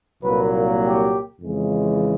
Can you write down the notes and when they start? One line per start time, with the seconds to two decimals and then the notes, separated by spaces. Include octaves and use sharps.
0.23 C2 A#2 F#3 A#3 B4
0.83 G4
1.41 F2 C#3 E3 G#3